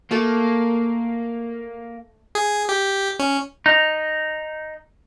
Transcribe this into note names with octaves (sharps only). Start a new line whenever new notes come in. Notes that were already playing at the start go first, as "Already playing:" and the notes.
A3 A#3 A4
G#4
G4
C#4
D#4